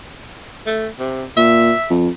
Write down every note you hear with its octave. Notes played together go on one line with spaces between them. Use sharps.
A3
C3
A#2 E5
F2